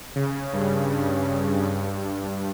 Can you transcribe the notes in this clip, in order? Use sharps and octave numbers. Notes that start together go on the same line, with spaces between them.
C#3
G2
G2
G2